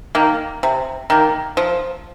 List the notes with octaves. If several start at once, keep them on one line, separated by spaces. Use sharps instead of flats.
D#3 A#3
C3
D#3 A#3
F3